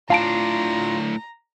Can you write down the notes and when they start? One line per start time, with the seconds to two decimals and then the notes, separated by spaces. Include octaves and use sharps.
0.10 A2 D4 F4 F5 A5 A#5 D7